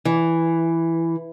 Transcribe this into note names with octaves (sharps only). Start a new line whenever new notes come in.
E3